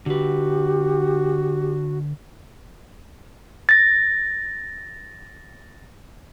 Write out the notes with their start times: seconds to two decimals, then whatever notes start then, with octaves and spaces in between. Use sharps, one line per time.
0.06 D3 F#4 G4 B4
3.69 A6 A#6